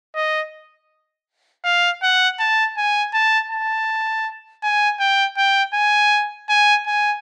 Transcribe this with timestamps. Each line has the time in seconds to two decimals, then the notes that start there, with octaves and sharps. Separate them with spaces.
0.15 D#5
1.64 F5
2.03 F#5
2.39 A5
2.77 G#5
3.13 A5
3.51 A5
4.63 G#5
5.00 G5
5.37 G5
5.74 G#5
6.49 G#5
6.86 G#5